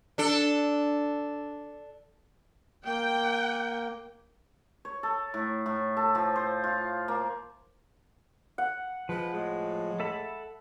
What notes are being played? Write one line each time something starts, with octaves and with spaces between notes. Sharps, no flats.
D4 A4
A#3 G5
C#5
A4
A2
A2
A4
F3
C5
F4
A#3
F#5
F3 G#3 B4
A2 G#3
A4 E5 B5